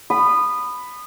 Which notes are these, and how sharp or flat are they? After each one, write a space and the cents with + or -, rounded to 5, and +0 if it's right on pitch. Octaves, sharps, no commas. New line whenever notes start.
B5 +10 D#6 -20